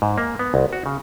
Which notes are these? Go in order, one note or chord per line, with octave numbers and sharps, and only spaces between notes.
G#2
A#3
B3
C2
F#4
C#3